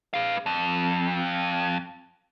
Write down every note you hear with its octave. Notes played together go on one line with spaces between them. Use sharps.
B4 F5
F2